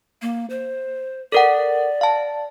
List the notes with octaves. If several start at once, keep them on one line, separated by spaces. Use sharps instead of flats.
A#3
C5
A4 A#4 D5 F#5
F5 A5